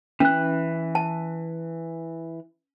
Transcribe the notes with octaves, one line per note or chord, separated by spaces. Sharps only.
E3 C#4 F#6
A5